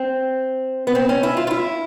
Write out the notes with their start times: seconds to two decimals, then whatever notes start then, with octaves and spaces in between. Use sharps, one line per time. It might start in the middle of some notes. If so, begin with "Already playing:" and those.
Already playing: C4
0.87 B3
0.95 C4
1.09 C#4
1.23 E4
1.37 F4
1.47 F4
1.51 E4